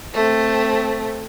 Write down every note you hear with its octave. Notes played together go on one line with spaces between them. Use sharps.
A3 C4